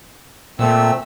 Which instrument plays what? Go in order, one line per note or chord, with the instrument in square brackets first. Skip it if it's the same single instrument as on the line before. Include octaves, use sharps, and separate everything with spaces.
[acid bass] A#2 [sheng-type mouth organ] A3 C4 E6